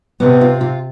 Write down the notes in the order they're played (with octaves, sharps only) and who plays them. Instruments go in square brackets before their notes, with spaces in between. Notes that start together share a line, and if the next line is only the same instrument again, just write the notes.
[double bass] C3 [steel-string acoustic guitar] B3
[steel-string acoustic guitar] F4
F4